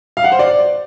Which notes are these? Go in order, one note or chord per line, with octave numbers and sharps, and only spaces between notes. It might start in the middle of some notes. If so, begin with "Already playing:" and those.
F5
F#5
C5
D5